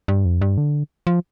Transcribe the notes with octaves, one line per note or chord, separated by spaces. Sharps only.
G2
F2
G2
D3
F3